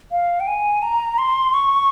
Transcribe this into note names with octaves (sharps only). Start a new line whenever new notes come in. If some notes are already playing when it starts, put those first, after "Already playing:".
F5
G5
G#5
A#5
C6
C#6